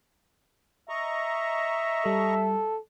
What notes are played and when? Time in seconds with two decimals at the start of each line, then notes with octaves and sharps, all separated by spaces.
0.89 D#5 E5 A#5 C#6
2.06 G3 A4